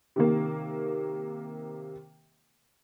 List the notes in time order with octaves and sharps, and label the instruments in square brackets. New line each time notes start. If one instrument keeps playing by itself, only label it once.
[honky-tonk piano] C3 D#3 A#3